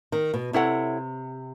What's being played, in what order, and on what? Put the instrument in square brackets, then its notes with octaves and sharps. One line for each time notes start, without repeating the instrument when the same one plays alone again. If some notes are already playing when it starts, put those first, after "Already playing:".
[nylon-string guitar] D#3
B2
[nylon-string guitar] C3 [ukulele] E4 A4 C#5 F#5